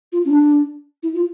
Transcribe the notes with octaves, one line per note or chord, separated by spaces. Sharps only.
F4
C#4
D4
E4
F4